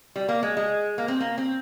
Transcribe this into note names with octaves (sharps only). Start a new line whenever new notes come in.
G3
A#3
G#3
G#3
A#3
C4
A#3
C4